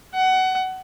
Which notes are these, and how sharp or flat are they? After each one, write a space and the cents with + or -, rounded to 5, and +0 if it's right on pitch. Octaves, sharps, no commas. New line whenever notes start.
F#5 +20